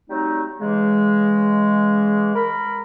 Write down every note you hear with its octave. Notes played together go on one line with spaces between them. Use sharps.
F#3 G3 A3 C4 D#4
C#3 E3 G#3
A#4 B5